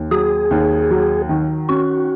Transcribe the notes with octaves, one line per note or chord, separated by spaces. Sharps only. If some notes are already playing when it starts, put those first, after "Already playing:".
Already playing: D#2
F#3 G#4
D#2
F#3
D#3
C#4 F#4